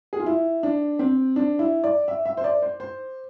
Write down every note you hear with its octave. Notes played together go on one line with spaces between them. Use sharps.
G#4
F4
E4
D4
C4
D4
E4
D5
E5
E5
C5
D5
C5
C5